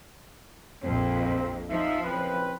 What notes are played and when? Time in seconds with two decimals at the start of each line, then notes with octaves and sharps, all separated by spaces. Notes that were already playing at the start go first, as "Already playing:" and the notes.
0.83 A#1 F2 C4
1.69 F3 D#4 E5
2.03 F#1 C4 B4